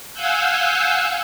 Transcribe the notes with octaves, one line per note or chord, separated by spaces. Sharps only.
F5 F#5 G#5 E6 F#6 G6